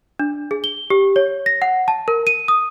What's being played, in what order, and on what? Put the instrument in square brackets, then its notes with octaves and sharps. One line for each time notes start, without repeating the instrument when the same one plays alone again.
[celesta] D4
G#4
G7
G4
C#5
A#6
F#5
A5
A#4
D#7
D#6